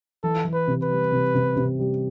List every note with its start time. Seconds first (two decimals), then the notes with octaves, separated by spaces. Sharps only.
0.23 E3 A4
0.45 E3
0.53 B4
0.67 C3
0.83 B4
0.90 G3
1.12 C3
1.34 C3
1.56 C3
1.79 G3